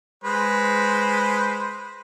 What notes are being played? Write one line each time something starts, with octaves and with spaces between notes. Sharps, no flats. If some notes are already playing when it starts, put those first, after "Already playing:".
G#3 B4 C5